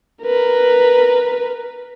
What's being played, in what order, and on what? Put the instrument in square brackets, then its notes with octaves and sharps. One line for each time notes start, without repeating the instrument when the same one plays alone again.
[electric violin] A#4 B4